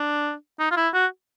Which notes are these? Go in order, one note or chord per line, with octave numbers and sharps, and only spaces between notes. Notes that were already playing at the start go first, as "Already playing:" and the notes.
Already playing: D4
D#4
F4
E4
F#4